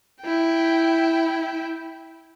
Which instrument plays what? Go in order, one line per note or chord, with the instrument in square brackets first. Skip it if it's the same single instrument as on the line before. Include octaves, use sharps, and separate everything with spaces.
[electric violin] E4 G5